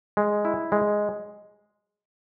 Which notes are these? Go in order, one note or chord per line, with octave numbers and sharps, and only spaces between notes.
G#3
E4
G#3